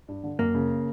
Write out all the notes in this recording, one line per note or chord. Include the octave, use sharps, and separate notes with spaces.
G2
D3
F#2 A#3
C#3